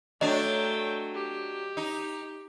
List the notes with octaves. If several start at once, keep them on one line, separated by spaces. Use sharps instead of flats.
F#3 A3 D4 D#5 G5
G4
D#4